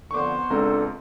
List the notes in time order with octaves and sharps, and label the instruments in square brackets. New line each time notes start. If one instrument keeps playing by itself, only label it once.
[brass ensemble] F2 D3 [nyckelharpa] B3 C5 [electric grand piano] C#6 D6
[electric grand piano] C#2 C4 A#5 [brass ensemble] D4 [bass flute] A4